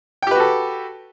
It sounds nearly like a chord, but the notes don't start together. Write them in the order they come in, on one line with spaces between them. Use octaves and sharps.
G5 G4 B4 F#4 A4